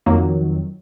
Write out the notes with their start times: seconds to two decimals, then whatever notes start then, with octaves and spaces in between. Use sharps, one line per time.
0.06 F2 D#3 F#3 A#3